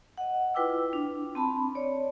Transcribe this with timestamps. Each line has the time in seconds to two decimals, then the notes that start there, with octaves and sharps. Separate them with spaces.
0.18 D#5 F#5
0.54 E4 F4 B4 G5 D6 E6
0.93 D4
1.35 C4 A5 B5
1.75 C#5 D5